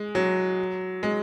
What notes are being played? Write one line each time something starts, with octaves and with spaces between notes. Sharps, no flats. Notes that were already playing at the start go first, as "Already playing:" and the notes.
Already playing: G#3
F#3
G#3